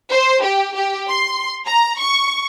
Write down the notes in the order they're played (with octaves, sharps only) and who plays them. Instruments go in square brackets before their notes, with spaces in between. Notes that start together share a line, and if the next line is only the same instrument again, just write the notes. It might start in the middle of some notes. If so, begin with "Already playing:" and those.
[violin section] C5
G4
G4
C6
A#5
C#6